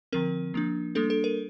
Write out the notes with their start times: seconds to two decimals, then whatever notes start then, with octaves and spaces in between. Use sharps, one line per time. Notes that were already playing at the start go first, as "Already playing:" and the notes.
0.13 D3 F3 C4 A#4
0.54 F3 A#3 D4
0.95 G3 A#3 D4 A4
1.10 A4
1.24 A#4